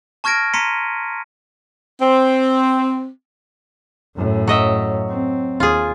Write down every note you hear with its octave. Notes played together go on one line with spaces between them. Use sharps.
A5 C#6 F6 G#6 A#6 D7
A#5 C6 B6 C#7 D#7
C4
F#2 A2
F#3 D#5 E5
C4
D#2 F4 G#4